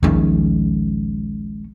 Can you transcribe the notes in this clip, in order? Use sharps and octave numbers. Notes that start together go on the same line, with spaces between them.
D#1 A#1 D#3 G#3 C#4